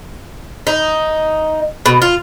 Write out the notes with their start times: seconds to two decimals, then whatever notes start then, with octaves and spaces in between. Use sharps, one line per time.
0.67 D#4
1.86 B2
2.02 F4